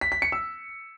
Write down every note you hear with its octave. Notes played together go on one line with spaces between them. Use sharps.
B6
B6
C#7
E6